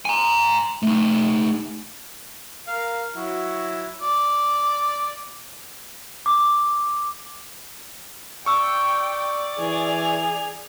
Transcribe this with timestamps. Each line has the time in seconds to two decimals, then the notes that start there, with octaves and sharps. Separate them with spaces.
0.05 G#5 A#5
0.83 A3 D#4
2.67 A#4 F5
3.15 F#3 E4 F#4
4.02 D5
6.26 D6
8.46 D5 G5 C#6 E6
9.59 E3 G#4 F7